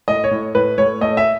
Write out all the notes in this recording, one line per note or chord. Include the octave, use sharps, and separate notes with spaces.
A2 D#5
C#5
A2
A2 B4
A2 C#5
A3 D#5
E5